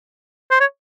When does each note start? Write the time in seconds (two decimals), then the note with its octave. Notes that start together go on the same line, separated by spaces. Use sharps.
0.51 C5
0.60 C#5